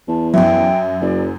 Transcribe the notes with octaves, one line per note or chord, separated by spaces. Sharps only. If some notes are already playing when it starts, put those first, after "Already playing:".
E2 A5
F#2 F#3 E5 G5
F#1 D5